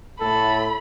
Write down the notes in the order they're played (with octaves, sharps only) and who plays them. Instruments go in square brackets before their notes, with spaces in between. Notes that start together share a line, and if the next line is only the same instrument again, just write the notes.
[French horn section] A2 [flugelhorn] A4 [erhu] B5